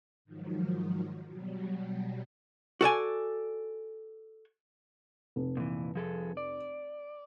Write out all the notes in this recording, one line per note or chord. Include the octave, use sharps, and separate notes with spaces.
G#2 D#3 F3 F#3
B2 F#3 G3
F#4 A4 D5 G#5
F1
A#2 E3
F3 G#4 A4
D5